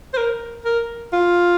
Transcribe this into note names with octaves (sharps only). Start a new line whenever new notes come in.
C5
A#4
A#4
F4